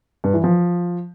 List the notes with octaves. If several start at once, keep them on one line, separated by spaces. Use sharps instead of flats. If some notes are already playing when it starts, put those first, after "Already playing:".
G2
E3
F3